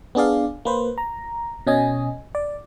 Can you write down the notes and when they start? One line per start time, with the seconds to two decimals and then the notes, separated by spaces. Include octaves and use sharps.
0.15 B3 D4 G#4 D5 F5
0.65 A#3 B4 C5
0.98 A#5
1.67 B2 C#4 D#5 G#5
2.35 D5